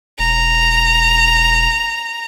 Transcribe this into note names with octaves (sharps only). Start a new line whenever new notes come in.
E1 A#5